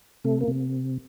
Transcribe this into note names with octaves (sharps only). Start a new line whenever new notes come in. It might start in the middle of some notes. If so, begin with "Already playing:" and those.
C3 A3
A#3
C3